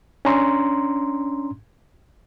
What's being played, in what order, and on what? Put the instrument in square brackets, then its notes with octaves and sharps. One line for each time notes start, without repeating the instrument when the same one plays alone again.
[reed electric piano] C#4 D4 A#5 C6